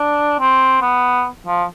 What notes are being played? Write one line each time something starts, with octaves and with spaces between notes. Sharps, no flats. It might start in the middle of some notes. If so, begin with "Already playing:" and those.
Already playing: D4
C4
B3
F3